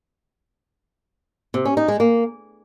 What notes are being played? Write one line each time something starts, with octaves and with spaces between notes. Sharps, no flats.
C3
C#4
D#4
G#3
A#3